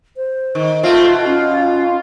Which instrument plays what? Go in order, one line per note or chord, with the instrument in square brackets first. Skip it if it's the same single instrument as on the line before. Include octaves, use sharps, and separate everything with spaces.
[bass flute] C5
[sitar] D#3
[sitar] A3 C4 [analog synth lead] F4 [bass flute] E5
[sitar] B2
[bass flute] C#4 [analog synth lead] F4